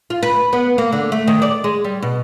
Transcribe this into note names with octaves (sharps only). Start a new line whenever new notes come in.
F4
B4
B3
A#3
D3
A3
D#3
D5
G#3
G3
B2